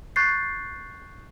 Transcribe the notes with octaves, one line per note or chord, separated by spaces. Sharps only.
C#6 F#6 G6 A6 C7